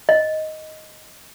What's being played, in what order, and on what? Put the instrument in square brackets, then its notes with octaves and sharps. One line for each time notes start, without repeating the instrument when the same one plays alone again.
[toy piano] D#5